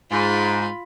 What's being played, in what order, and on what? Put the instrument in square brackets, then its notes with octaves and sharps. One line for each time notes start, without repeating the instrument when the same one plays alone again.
[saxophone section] G#2 [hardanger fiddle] F4 B5